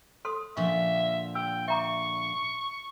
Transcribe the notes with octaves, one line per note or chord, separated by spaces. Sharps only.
A4 C6 D#6
A#2 D3 F3 E5 C#6
G5 E6
E5 A#5 C#6 D6